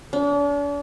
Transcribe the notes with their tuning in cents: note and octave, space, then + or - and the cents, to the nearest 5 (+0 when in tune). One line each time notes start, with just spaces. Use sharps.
D4 -40